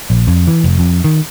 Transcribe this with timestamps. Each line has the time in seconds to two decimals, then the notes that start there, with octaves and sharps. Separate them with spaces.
0.10 A#1
0.27 F2
0.47 E3
0.64 F1
0.79 F2
1.04 D#3